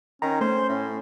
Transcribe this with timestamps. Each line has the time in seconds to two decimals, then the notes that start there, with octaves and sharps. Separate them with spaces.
0.22 D#3 C#4 A#5
0.41 A3 C5
0.69 A2 C#4